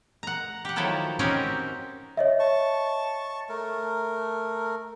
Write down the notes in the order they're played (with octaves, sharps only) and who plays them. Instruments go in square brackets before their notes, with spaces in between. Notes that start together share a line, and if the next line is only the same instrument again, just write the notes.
[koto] F#5 A#5
G4 F#5
D#3 F3 F#3 E4 A4 A#4
C4 C#4 D#4 F#4 G4 A#4
[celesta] C#5 D#5 E5
[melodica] A5 C#6
A3 A#4